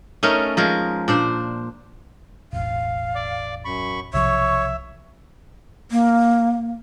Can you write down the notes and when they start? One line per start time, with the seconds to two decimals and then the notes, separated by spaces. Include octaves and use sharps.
0.23 A3 C#4 D#4 A#4
0.57 F3 G#3 A#4
1.08 A#2 D4 C5
2.53 E1 A1 F5
3.15 D5 D6
3.65 F#2 B5 C#6
4.14 B1 C3 F3 C#5 E5 C#6
5.91 A#3